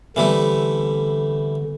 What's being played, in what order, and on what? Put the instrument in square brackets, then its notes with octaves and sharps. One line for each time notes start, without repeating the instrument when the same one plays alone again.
[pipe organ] D3 [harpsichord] E3 G3 E4 [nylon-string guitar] A3 B3 C4